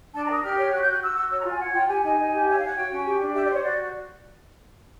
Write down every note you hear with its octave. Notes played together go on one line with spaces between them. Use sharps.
D4 A5
A#5
A#4 D#6
G4 F6
C#5 F6
F#4 F#6
G6
F#4 F#6
F#4 E6
F#4 E6
C#5 E6
A#5
F4 G#5
C#5 F#5
F4 G5
G4 G#5
D#4 G#5
D#4
G4
C#5 E5
C#5 F5
F#5
F#4 G5
C#4
G4
D4
G4 E5
D5
C5
C#5
F#4 D5